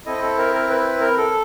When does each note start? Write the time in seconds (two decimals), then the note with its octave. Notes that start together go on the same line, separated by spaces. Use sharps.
0.06 C4 E4 A4 D#5
0.22 A4
0.38 A#4
0.54 A#4
0.70 B4
1.01 A#4
1.17 A4